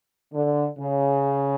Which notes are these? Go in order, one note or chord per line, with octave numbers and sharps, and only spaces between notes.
D3
C#3